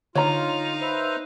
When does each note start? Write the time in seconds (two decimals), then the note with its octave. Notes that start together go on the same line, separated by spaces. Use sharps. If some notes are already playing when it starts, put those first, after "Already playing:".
0.15 D3 D#4 F4 C#5 F5 A#5
0.81 B4 C5 E5